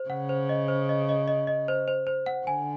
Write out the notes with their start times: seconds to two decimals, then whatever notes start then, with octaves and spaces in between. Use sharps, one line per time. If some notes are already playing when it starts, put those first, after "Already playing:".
Already playing: C5
0.10 C#3 F#5
0.29 C5
0.49 D#5
0.68 C5
0.89 D#5
1.09 D#5
1.28 D#5
1.47 D#5
1.68 C5
1.88 C5
2.07 C5
2.26 F#5
2.47 D3 G#5